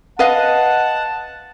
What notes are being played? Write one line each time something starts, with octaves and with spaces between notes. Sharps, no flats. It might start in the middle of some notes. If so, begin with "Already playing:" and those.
B4 D#5 F5 F#5 A5